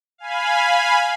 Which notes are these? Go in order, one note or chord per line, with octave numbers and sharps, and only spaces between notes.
F5 G#5 B5